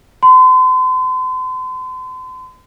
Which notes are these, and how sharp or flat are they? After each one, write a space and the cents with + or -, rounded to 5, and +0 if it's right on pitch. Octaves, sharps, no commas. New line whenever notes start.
C6 -40